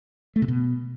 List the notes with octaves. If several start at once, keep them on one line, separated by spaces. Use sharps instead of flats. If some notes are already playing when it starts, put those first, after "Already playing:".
A3
C3
B2